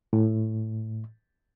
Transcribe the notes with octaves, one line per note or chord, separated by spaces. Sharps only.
A2